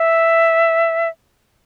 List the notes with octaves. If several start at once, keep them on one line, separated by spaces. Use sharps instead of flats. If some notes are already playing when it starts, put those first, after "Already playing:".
Already playing: E5